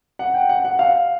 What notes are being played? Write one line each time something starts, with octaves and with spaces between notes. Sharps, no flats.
F#5
G5
F#5
F#5
F5